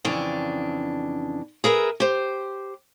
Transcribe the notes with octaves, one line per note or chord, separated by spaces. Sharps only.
F2 C#3 E3 D4 G4
G#4 A#4 B4 E5
G4 C5